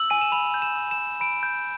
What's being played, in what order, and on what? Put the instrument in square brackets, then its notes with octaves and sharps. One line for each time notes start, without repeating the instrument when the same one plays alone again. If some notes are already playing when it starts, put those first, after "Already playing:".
Already playing: [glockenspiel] E6 F#7
G#5 D#7
E7
B5 F7
G6
E7
E6
E7
G#5
B5 D7
G6